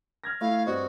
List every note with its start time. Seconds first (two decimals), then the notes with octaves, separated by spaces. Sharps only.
0.24 F6 G#6 A#6
0.41 A3 E4 F5
0.66 G2 C4 F#4 D#5